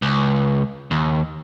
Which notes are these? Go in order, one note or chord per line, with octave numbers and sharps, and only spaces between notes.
C#2
D#2